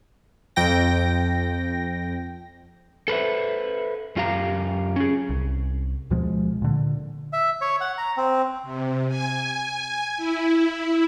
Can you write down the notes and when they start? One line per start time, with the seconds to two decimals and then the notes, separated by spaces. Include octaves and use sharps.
0.56 F2 G5 A#6
3.08 A4 B4 C5 E5
4.16 F#2 F4 G4 F5 A#5
4.96 C#4 G#4
5.29 C2
6.10 D2 B2 F3 G#3
6.62 A#2 D3
7.33 E5
7.61 C#5
7.81 F#5
7.98 A#5
8.17 C4
8.63 C3
9.08 G#5
10.17 E4